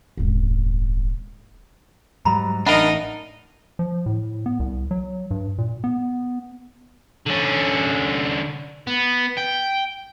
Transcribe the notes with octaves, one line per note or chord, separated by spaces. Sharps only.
D#1 G#1
G#2 F#3 G3 A#5 B5
A1 D4 D#4 A#4 D#5 E5 F#5 B5
F3
A2
B3
C2
F#3
G2
A#2
B3
D3 C#4
B3
G5